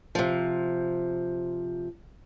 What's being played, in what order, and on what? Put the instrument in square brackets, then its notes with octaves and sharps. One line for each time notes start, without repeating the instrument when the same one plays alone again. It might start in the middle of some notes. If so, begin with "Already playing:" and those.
[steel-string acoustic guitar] C3 F3